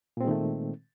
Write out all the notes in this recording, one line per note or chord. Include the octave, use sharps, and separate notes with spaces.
A#2 D#3 G#3 A3 C4